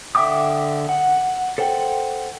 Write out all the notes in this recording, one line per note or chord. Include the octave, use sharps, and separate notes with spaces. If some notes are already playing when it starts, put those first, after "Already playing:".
D3 E5 G5 D6 D#6
F#5
A4 C5 F#5 G5